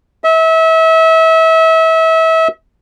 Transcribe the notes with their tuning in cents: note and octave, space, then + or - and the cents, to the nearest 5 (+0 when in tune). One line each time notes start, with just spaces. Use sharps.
E5 -30